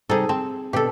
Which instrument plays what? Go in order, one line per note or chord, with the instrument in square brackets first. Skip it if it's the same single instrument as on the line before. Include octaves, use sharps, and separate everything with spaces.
[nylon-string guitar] C3 G3 D#4 [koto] G#4 A4
[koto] C4 [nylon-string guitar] A5
[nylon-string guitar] B2 D4 [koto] G4 A4